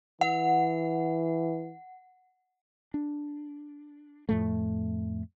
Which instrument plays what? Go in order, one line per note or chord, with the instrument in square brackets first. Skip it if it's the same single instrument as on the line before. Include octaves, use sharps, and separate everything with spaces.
[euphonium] E3 [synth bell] F#5
[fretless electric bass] D4
F2 A2 A3